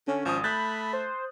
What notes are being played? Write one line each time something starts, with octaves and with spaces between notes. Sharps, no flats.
D3 C#4
G#1 F3 D#6
A3 B5 F#6 G6 A6
C5